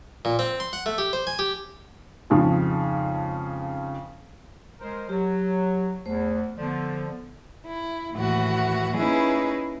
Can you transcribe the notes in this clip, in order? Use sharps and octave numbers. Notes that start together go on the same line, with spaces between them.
A#2
C4
C6
F#5
A3
G4
C5
G#5
G4
F2 G#2 C#3 F3
G#3 A#4 C5
F#3 G4
E2 A3 C5
D3 F3 B3 D5
E4
D#2 A2 E3 F#4 F#5
A#3 C#4 D#4 E4 G#4 B4